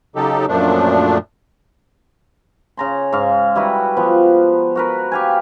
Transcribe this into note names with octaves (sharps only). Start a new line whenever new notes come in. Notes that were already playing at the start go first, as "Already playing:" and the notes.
C#3 F#3 D#4 G4 A4
F#2 A#2 F3 A3 D4
C#3 A#5 C6
G#2 F5
G3 E4 F#4 B4
F3 B3
F#4 A#4 B4
G4 F5 G#5